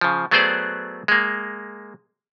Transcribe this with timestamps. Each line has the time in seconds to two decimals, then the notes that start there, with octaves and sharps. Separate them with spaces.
0.01 C#3 F3
0.31 F#3 A3 B3 G#4 C5 D5
1.08 G#3 A#3